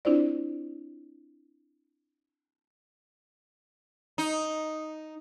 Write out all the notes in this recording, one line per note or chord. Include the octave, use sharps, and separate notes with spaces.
C4 D4 E4 F4 C5 D5
D#4